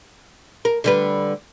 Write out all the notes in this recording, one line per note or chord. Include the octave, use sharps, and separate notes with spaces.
A#4
D3 G3 B4